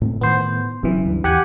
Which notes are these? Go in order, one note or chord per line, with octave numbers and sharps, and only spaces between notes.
A2 C4
A2 D#3 B3 C5
F#1 F#2 C#3 E3 C4
D2 G2
D#2 E3 G4 F#5 G#5